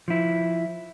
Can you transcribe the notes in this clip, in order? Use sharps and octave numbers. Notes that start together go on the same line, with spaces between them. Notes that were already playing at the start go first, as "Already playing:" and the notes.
F3 E4